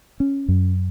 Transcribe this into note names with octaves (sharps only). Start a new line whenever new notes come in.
C#4
F#2